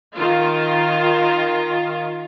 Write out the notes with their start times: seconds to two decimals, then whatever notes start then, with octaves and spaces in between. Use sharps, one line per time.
0.16 D#3 F4